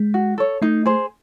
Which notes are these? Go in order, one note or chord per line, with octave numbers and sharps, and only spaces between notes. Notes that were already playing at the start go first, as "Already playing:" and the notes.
Already playing: G#3
F#4
A4 C#5
A3 D#4
G#4 C5